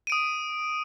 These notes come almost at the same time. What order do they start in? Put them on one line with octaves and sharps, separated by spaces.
D#7 D7 D#6